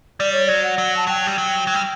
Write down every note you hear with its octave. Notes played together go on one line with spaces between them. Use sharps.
G3 D5
C#5
F#3 D5
F#5
F#3
A5
F#3 G5
G3
F#3
F#3
G3